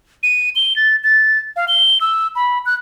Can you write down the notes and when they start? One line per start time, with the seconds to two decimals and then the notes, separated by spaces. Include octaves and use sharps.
0.23 D#7
0.55 G7
0.76 A6
1.04 A6
1.56 F5
1.68 G7
2.01 E6
2.35 B5
2.66 F#6